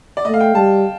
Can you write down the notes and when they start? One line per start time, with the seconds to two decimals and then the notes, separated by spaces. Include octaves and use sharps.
0.17 D5
0.25 A3 D#5
0.34 F5
0.41 G5
0.55 G3 A5